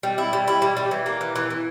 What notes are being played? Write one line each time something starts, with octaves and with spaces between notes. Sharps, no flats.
G3
E4
G3
E4
G3
G3
E3
A#3
E3
E3
E3